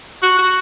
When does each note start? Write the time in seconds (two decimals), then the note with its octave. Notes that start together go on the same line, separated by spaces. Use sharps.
0.23 F#4
0.38 F#4